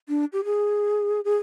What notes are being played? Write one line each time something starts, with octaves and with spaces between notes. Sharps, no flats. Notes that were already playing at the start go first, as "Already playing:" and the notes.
D4
G4
G#4
G#4